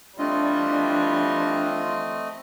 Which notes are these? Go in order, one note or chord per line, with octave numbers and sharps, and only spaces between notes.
E3 G3 A3 C4 D4 F4 D#5